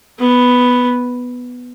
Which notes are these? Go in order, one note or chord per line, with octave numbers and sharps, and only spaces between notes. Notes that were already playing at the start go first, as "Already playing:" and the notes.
B3